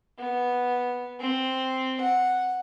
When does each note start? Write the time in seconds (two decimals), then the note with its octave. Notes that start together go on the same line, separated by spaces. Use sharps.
0.18 B3
1.20 C4
2.01 F#5